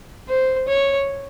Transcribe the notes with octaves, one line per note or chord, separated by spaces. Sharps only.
C5
C#5